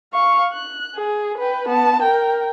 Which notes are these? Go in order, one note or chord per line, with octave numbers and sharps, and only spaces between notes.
F5 C#6
F#6
G#4
B4 G5
B3 A5
A#4 G5